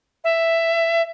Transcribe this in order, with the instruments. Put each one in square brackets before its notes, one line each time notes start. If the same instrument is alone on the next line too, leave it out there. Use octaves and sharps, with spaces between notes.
[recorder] E5